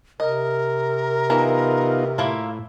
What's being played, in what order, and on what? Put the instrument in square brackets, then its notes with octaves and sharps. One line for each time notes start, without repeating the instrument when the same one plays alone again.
[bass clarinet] C3 [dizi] A#4 [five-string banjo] D#5
[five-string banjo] E3 A#5 [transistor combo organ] B3 D#4 F4
[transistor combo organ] A2 [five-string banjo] A#3 E4 F4